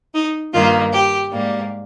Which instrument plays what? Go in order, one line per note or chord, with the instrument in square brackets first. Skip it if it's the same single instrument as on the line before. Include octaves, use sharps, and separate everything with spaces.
[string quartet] D#4
G2 D#3 A#3 F4
G4
G#2 G3 A#3